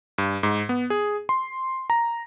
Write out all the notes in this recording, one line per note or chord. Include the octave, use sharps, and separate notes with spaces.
G2
G#2
B3
G#4
C6
A#5